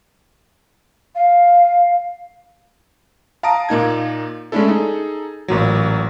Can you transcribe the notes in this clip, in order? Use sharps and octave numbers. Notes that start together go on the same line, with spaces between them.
F5
F5 A5 A#5 D#6 D7
A#2 A#3 D#4 G#6
G#3 A3 C#4 D4 E4 A4
D#4 G#4 A4
A1 A#2 F#3